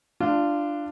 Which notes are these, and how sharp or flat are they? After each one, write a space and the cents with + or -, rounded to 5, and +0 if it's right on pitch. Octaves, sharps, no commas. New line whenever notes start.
D4 +10 F4 -15